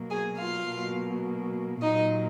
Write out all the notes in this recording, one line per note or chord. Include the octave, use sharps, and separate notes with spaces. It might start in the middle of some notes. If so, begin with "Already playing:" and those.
Already playing: B2 F#3 A#3
G#4 G#5
F4 F5
B2 F#3 A#3
A#2 F#3 A#3 D#4 D#5